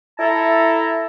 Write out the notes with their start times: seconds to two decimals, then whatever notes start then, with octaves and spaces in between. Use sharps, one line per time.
0.19 E4 A4 E5 A5 A#5